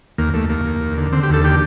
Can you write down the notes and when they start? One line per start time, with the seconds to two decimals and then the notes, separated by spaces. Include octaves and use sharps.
0.18 D#2 A#3
0.34 D#2 A3
0.49 D#2 A#3
0.65 D#2
0.81 D#2
0.97 D3
1.13 D3 C4
1.23 G4
1.29 D#2 A4
1.44 D3 G4